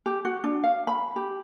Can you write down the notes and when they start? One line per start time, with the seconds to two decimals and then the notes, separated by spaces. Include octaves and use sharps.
0.06 G4
0.25 F#4
0.44 D4
0.64 F5
0.87 B5
1.16 G4